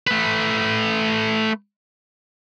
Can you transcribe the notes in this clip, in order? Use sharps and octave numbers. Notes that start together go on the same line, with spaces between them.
A3 B4